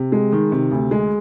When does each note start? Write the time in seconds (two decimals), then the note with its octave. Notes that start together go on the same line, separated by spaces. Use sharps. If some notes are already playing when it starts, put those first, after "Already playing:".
Already playing: C3
0.12 G#3
0.32 D#3
0.52 C3
0.71 D2
0.91 G#3